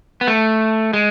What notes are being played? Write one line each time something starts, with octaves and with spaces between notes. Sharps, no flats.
B3
A3
G#3